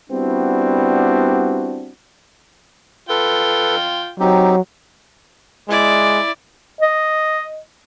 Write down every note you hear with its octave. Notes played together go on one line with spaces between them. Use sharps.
G3 B3 C4 D4 E4 F#4
F4 A4 B4 G5
F#3 C4 D#4 G4
G#3 E4 D5
D#5